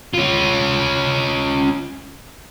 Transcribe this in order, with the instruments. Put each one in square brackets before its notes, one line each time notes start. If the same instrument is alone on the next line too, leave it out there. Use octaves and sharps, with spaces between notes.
[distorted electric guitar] C#4 F4